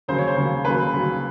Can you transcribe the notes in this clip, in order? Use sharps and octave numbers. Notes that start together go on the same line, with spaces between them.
D#2 C#3 F#3 C5
C#5
C5
D#2 C#3 F#3
D#2 C#3 F#3 B4
D#2 C#3 F#3